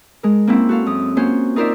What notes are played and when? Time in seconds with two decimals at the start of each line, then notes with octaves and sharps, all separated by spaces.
0.23 G#3 A#4
0.47 A#3 C4 C#4 E4
0.69 F#4 A4 F5
0.86 F#2 D#6
1.17 A#3 C#4 F4 F#4 C5
1.56 D#4 F4 A#4 C5 D5 E5